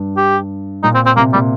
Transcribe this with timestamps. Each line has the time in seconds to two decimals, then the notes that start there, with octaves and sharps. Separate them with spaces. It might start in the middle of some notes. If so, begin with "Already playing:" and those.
Already playing: G2
0.17 G4
0.83 A#2 D#4
0.94 C4
1.06 C4
1.16 C3 A#3
1.33 A#2 G3